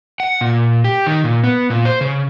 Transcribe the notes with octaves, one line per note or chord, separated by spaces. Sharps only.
F#5
A#2
G4
D#3
A#2
B3
A#2
C5
C#3